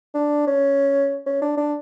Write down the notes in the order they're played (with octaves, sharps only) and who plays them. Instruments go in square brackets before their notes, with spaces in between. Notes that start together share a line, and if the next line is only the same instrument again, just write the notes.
[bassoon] D4
C#4
C#4
D4
D4